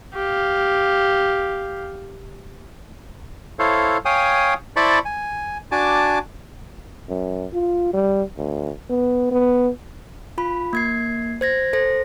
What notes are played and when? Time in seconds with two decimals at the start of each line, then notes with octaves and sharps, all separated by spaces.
0.14 G4 F5
3.59 E4 A4 C5 C#5 F5
4.05 C#5 F5 G5 G#5 D#6
4.76 E4 C5 D5 A5 B5 C#6
5.05 G#5
5.72 D4 F#4 G#5 A5 D6
7.09 F#2
7.53 F4
7.93 G3
8.38 D2
8.90 B3
9.31 B3
10.38 F4 B5
10.73 A#3 G#6 C7
11.41 C5 G#6 A#6
11.73 A4 C5 A#6